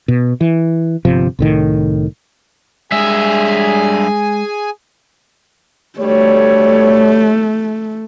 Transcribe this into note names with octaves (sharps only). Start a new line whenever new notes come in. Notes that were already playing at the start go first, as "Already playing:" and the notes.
B2
E3
G1 C3 F3
C2 A2 D#3
G2 G#3 G#4 E5 G#5
D2 G3 A3 C#5